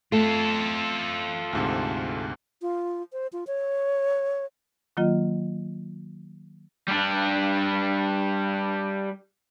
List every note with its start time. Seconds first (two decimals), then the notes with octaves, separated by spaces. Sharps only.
0.12 A3 F4 A4
1.53 D2 G#2 C3
2.62 F4
3.13 C5
3.33 F4
3.47 C#5
4.97 D#3 F#3 A#3 F4 D#5
6.88 G3 D4